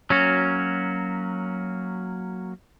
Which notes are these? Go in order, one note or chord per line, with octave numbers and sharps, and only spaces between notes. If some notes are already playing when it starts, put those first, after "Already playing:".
F#3 A#3 C#4 F#4